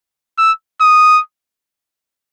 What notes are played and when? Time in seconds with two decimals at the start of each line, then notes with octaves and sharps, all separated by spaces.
0.38 E6
0.81 D#6